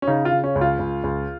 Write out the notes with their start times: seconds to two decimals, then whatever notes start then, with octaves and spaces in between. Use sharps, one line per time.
0.02 C#4
0.07 C#3 D#4
0.25 F4
0.31 C#3
0.44 C#4
0.55 C#2
0.61 F4
0.79 C#2
1.04 C#2